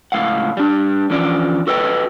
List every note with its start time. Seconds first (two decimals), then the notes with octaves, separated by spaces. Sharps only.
0.12 C#2 A2 F5 F#5
0.57 G3 D4
1.10 D3 E3 F3 C#4 D5
1.67 F#4 A4 B4 D#5 G5